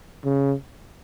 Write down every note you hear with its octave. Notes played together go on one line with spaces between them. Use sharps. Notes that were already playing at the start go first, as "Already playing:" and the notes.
C#3